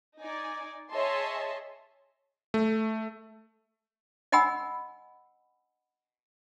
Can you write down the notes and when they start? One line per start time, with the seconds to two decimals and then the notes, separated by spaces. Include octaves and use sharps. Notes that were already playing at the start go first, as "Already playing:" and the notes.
0.20 D#4 D5 G#5
0.91 G#4 C#5 D#5 E5 A5 C6
2.54 A3
4.32 D#5 F#5 G#5 B5 E6